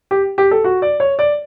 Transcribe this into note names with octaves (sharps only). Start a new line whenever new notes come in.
G4
G4
A4
F#4
D5
C#5
D5